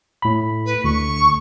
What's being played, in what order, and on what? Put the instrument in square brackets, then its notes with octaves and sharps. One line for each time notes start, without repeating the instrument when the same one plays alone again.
[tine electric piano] A2 B5
[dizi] B4
[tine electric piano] D2 [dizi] C#6